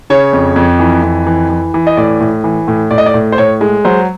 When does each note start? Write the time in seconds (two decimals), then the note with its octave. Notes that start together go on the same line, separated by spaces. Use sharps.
0.10 C#3 C#5
0.33 F2
0.56 F2
0.79 E3
1.03 F2
1.27 E3
1.50 E3
1.74 E3
1.87 D#5
1.97 A2 D5
2.21 A2
2.44 E3
2.68 A2
2.91 A2 D5
2.98 D#5
3.06 D5
3.14 A2
3.32 C5
3.38 A2 C#5
3.61 G#3
3.85 F#3 C5